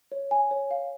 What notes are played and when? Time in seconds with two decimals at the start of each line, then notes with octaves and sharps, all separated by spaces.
0.12 C#5
0.31 G#5
0.51 C#5
0.71 F5